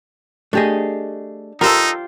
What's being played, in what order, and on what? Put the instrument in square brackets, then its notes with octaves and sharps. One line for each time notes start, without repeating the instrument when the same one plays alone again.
[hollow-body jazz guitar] A3 G4 G#4 [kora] D4 D#5
[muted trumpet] D#4 [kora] F4 G4 C5 [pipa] A4 A#4